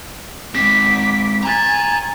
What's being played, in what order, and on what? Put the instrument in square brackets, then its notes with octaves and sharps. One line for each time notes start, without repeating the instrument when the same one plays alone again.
[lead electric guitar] G#3 C4 [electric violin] D6 B6
[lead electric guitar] G5 A#5 [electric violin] G#5 A6